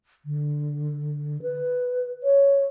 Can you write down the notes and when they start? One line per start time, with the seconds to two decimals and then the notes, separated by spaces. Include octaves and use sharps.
0.25 D3
1.42 B4
2.23 C#5